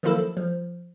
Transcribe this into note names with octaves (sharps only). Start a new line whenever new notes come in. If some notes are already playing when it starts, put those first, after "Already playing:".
D#3 F3 F#3 A#3 E4 A4
F3